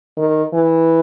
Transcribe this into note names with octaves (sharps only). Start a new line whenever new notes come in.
D#3
E3